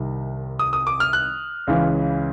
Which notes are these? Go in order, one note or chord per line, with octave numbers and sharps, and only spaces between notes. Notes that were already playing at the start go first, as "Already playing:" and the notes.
Already playing: C2 C3 D#3
D#6
D#6
D6
F6
F#6
C#2 C#3 E3